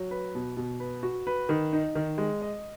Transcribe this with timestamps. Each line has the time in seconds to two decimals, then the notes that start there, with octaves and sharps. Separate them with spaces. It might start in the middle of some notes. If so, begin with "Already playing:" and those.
Already playing: F#3
0.11 B4
0.35 B2
0.57 B2
0.80 B4
1.03 F#4
1.27 B4
1.49 D#3
1.73 D#4
1.95 D#3
2.18 G#3
2.42 D#5